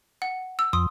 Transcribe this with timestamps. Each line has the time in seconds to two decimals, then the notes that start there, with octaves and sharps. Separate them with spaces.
0.22 F#5
0.59 E6
0.73 F2 C6 D#6